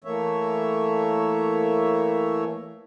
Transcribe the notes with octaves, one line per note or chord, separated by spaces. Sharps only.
E3 A3 A#3 C#5 E5